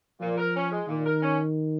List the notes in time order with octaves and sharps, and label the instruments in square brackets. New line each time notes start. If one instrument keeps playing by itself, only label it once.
[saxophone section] A#2 [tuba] F3
[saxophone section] A#4
C#4
G#3
[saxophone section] A#2 [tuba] D#3
[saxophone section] A#4
C#4